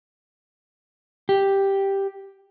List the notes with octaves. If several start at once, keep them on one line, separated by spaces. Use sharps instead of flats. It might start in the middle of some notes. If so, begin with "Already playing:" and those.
G4